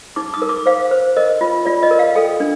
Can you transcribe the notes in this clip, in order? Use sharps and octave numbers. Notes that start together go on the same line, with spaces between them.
D#4 D6
D#6
A#4
D6
C5 F5
C5
A#4 D#5
F4
F4 D5
D#5
A#4
F5
A4 G5
D4